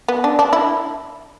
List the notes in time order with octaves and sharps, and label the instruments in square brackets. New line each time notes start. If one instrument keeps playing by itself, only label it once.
[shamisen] B3
D4
D4
E4